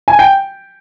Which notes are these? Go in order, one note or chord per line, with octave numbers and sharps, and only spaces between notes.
G#5
G5